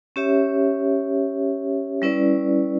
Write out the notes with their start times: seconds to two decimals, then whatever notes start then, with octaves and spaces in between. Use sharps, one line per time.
0.16 C#4 G4 C#5 E5
2.02 G3 C#4 E4 B4 D5